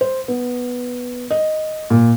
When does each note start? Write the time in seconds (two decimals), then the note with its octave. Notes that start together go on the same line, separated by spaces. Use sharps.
0.01 C5
0.28 B3
1.31 D#5
1.90 A#2